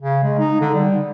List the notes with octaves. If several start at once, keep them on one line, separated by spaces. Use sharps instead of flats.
C#3
G#3
D#4
D3
G3